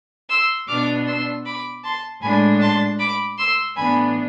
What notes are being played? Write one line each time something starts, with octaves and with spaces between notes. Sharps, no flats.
C6 E6
B2 B3 D4 D6 F6
C6 E6
B5 D6
A5 C6
A2 G#3 D4 G#5 B5
A5 C6
B5 D6
C6 E6
A2 E3 B3 D4 G#5 B5